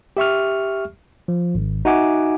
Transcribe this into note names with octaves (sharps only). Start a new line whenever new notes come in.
G4 E5 C#6 F6
F3
G#1
D#4 F#4 E5 F#5 G#5 D6